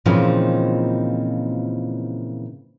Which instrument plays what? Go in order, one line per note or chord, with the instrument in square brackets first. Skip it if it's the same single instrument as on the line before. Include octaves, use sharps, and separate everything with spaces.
[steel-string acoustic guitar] A#2 C#3 E3 F3 C4 D#4